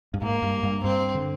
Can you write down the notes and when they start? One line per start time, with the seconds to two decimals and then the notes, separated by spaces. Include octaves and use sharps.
0.14 G2
0.22 G#2 A#3
0.42 G2
0.63 G2
0.84 G2 C4
1.15 D3